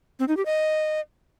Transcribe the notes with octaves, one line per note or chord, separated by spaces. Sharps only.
C4
D#4
G4
D#5